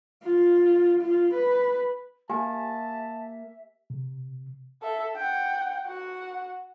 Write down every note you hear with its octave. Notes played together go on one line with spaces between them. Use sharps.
F4
F4
B4
A#3 G4 E5 G#5 A5
C3
A4 E5
F#5 G5
F#4 F#5